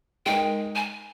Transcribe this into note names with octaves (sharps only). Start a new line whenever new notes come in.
G#3 D#4 A#4 G5
G#5